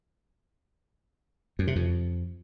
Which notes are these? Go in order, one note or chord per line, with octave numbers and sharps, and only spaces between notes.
F#2
C3
F2